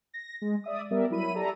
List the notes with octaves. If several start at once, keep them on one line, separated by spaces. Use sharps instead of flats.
A#6
G#3
D5 E5 D#6
G3 B3 A#4 D5 E5
F#3 E4 B5 D#7
G4 A4 D5 E5 A#5